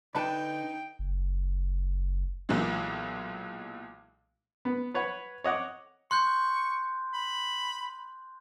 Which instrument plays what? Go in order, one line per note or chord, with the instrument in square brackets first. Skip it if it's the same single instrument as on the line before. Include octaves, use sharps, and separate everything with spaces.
[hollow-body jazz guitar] D3 D5 B5 [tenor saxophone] D#4 [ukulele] B4 A5 [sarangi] G5
[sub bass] F#1
[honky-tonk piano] B1 A#2 E3 F#3 G#3
[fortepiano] B3
B4 C#5 F#5 B5
C#5 D#5 F#5 D6
[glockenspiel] C6 F#6 G6 [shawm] C#6
[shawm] B5